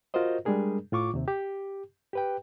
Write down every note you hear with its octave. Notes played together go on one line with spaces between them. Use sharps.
F4 F#4 A#4 C5 D#5
G3 G#3 D4 G#4 A#4
A2 F4 C#6 D6
D#2 C3
G4
G4 B4 G5